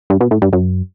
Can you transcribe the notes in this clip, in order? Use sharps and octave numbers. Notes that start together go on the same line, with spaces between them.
G2
B2
A2
G2
F#2